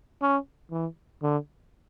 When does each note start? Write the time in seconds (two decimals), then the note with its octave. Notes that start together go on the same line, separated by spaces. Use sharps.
0.22 C#4
0.71 E3
1.22 D3